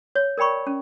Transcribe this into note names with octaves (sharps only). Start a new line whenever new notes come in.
C#5
A#4 D5 G5 B5 C#6
C#4